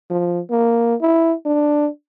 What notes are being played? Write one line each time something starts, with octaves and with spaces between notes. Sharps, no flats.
F3
A#3
E4
D4